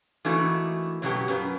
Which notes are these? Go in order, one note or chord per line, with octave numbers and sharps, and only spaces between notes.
E3 A3 A#3 D#4 E4 F#4
F#2 B2 F#3 B3 G4
F#2 F3 B4